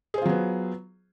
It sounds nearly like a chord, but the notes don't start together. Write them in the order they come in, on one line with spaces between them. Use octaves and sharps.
G#4 C5 F4 F#3 B3